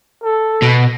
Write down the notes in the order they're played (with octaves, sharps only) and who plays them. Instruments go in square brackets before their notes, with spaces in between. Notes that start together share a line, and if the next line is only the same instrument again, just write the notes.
[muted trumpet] A4
[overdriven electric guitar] B2